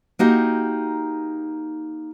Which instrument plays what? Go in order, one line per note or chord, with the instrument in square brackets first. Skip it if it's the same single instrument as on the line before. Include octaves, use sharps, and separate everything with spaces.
[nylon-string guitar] A#3 D#4 F#4 G4